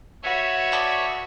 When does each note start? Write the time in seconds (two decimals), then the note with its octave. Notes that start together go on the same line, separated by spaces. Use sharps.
0.23 F#4 B4 C#5 E5
0.72 B3 A4 D5